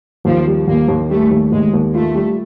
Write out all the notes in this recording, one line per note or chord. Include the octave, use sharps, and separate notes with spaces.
D#2 F3
G3
D#2 A#3
D#2
G3 A3
D#2
D#2 G#3
D#2
A3 F4
G3